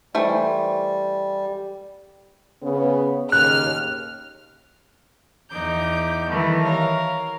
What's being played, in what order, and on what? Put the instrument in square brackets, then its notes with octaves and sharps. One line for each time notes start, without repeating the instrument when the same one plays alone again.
[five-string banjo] E3 A3 C5 [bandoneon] G3
[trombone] C#3 [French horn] B3
[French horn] D#2 [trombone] C#3 [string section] F6 [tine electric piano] F#6
[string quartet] E2 D#4 D6 G6
D#3 E3 G3 A3 B3
A#4 C#5 F5